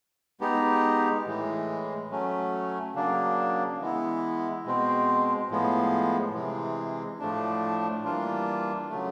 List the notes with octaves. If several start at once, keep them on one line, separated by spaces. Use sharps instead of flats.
G#3 B3 D#4 G4
A2 E3 G#3
F#3 A3 C#4
C#3 F#3 A#3 D4
E3 G#3 B3 E4
B2 G#3 C4
A2 F3 G#3 B3
C3 E3 G#3
A2 F3 A3 D4
E3 G3 A#3 D4 F4
C#3 F#3 A3